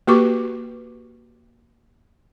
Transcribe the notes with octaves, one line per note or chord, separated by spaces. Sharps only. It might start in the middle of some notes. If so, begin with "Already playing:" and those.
A#3 F#4 G4 B4 C#6 D6